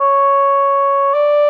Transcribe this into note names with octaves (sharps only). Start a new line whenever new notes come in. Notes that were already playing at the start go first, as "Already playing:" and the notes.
C#5
D5